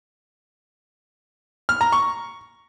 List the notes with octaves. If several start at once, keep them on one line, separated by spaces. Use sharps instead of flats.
F6
A#5
C#6